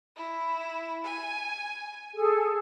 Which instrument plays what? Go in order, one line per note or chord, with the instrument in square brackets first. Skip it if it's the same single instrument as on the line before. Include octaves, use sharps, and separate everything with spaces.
[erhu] E4
G#5
[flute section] G#4 A4